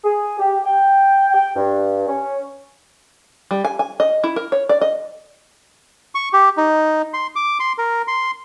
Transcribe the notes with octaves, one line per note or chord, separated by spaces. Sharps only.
G#4
G4
G5
G5
G2
C#4
G3
G#5
G#5
D#5
E4
A#4
C#5
D5
D#5
C#6
G4
D#4
C6
D6
C6
A#4
C6